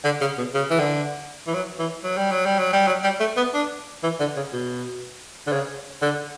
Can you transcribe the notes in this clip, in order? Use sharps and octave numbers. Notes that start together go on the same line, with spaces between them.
D3
C#3
B2
C#3
E3
D3
E3
F#3
E3
F#3
G3
F#3
G3
F#3
G3
F#3
G3
A3
B3
D4
E3
D3
C#3
B2
D3
C#3
D3